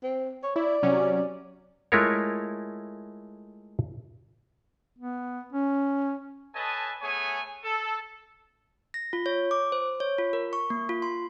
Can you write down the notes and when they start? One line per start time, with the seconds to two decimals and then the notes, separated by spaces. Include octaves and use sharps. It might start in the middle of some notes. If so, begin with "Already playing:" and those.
0.03 C4
0.44 C#5
0.56 E4 D5
0.83 C3 F#3 C#4
1.92 G#3 A3 E4 F4 A#4 C#5
4.98 B3
5.52 C#4
6.54 A4 B4 C#5 D#5 G#5 A5
7.01 A3 B3 G#4 C#5 G#5
7.63 A4
8.94 A#6
9.13 F4
9.26 C#5
9.51 D6
9.72 C5
10.00 C#5
10.18 F4
10.33 A#4
10.53 C#6
10.70 A#3
10.89 F4
11.02 C6